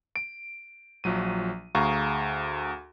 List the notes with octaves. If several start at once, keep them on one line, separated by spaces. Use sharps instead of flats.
D7
A#1 F3 F#3 D#7
D2 G#4 F5 A#5 C#6